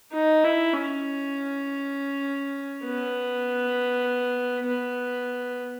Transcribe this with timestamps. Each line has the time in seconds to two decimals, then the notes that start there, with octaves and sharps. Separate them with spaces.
0.13 D#4
0.43 E4
0.73 C#4
2.85 B3
4.67 B3